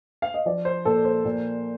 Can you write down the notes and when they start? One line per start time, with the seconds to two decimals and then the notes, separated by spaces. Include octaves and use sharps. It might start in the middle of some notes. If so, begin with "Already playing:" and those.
0.22 F5
0.34 D#5
0.45 F3 D5
0.65 C5
0.85 A#2 A4
1.05 C5
1.25 A#2